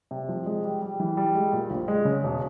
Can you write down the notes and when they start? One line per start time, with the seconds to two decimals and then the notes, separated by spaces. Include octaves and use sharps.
0.11 C3
0.29 F3
0.46 G#3
0.64 G3
0.82 G3
1.00 E3
1.17 G3
1.35 G#3
1.53 A#2
1.70 A#1
1.88 G#3
2.05 C#3
2.23 E1